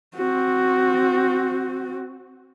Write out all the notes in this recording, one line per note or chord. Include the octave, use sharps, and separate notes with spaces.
C4 F#4